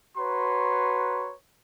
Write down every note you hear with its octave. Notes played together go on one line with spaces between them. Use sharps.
F#4 B4 C#5 A#5 C6